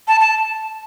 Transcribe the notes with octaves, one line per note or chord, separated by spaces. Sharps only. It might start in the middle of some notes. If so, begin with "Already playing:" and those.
A5
A5